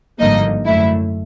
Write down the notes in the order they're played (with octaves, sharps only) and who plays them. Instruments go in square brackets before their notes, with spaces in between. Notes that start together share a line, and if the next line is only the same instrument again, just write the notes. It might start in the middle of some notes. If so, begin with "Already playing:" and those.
[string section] G#1 G2 D3 F3 A#3 D#4 D#5
F#2 D3 F#3 A3 E4 E5